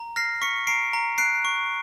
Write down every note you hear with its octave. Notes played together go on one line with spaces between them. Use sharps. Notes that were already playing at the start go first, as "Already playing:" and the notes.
Already playing: A#5
F6 A#6 C7
C#6 B6 C#7
A#5 C7 D7
A#5
F#6 C7 D7
C#6